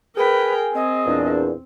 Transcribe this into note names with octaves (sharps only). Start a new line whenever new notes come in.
G#4 A#4 B4 G5
C4 D#5
E2 A#2 D4